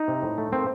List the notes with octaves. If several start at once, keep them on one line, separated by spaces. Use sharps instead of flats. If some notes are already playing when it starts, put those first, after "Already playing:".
Already playing: D#4
C3
A2
A3
A#3 C4